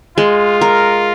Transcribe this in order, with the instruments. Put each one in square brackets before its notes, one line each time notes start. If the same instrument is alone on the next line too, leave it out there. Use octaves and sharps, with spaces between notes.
[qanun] G#3 [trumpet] F4
[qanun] A#4